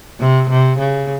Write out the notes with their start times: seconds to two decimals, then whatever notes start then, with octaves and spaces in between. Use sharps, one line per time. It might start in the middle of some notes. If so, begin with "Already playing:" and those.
0.20 C3
0.50 C3
0.79 C#3